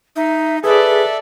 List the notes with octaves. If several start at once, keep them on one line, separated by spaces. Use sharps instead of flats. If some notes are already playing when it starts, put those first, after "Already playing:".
D#4 E5
G#4 A4 B4 D5 E5